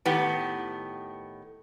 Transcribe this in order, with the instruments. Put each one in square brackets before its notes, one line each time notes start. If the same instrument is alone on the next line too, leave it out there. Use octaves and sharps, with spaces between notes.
[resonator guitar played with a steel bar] A2 D#3 B3 G4